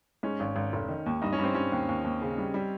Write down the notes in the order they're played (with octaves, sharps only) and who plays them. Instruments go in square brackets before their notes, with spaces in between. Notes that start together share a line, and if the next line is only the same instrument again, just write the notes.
[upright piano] G#2 [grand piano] C#4
[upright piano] G#1
G#1
F1
D#3
D#2
[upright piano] G2 [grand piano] D#4
[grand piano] C#4
[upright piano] G2
[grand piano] C4
[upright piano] G2 [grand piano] C#4
[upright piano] D#2
D#2
D#2
C#3
G3
G3